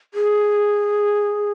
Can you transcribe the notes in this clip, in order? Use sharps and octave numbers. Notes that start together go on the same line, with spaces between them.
G#4